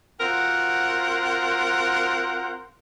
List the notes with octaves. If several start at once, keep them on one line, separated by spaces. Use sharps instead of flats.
C4 F4 F#4 A#4 C5 F#5